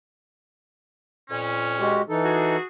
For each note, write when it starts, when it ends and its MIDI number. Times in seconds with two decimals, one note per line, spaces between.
1.29 2.01 41
1.29 2.01 46
1.29 2.01 61
1.80 2.02 56
1.80 2.02 66
1.80 2.02 67
2.09 2.57 52
2.09 2.57 63
2.09 2.57 69
2.24 2.66 66
2.24 2.66 68